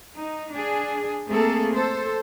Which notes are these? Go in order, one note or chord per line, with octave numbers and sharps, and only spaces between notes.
D#4
D4 G#4
A3 A#3 C4 G#4 A4
A4 C5